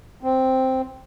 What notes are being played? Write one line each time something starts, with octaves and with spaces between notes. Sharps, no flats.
C4